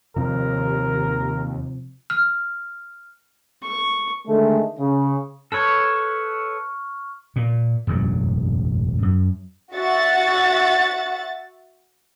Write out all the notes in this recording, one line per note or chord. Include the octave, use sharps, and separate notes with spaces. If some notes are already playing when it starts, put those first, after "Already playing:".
D#2 C3 F3 A#4
F6
C#6
D3 D#3 G#3 A3
C#3
A4 B4 C#5 C#6 F6
A#2
E1 A1 F#2 F#3
F#2
F#4 E5 F#5 A6